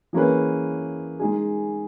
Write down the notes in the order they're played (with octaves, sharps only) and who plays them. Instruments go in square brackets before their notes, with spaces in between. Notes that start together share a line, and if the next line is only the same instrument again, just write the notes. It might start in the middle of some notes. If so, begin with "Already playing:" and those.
[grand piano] E3 A#3 C#4 G#4 B4
G#3 D#4 G#4